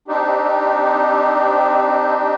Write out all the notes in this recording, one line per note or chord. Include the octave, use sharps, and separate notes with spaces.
C4 D4 D#4 G4